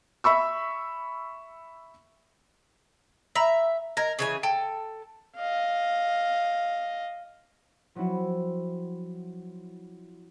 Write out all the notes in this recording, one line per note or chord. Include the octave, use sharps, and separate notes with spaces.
E5 B5 C#6 E6
E5 A#5 B5 A#6
A#4 D#5 G#6 A#6
C#3 E3 G#5
A4 G5
D#5 F5
F3 F#3 C4 E4 F#4